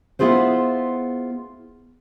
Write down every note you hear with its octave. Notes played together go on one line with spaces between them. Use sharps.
B3 E4 F4 G#4 C5